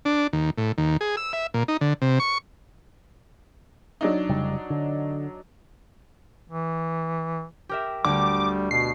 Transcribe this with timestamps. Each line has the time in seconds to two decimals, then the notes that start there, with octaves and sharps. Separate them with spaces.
0.05 D4
0.33 D#2
0.58 A2
0.78 D#2
1.01 G#4
1.17 E6
1.33 E5
1.54 A#2
1.68 D#4
1.81 D3
2.02 C3
2.20 C#6
4.01 F#3 D4 D#4
4.29 F1 C#3 G3
4.70 D3
6.50 E3
7.69 G4 A#4 E5
8.05 D2 G3 D6
8.71 B2 C7